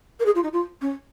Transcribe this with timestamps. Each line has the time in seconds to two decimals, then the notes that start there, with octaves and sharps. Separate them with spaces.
0.20 A#4
0.26 G#4
0.35 F4
0.43 D#4
0.53 F4
0.81 C#4